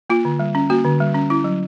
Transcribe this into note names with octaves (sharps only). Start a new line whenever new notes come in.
A#3 F4
D3
G3
C#4
A#3 F#4
D3
G3
C#4
C#4 E4
F#3